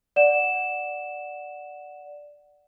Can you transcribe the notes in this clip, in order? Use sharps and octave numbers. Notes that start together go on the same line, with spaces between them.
D5 F#5 E7